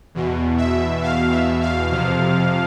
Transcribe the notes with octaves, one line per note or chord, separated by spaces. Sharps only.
E2 B2
E5
F5
E5
F5
F2 C3 F3